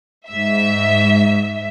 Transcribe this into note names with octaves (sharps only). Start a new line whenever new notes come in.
G#2 E5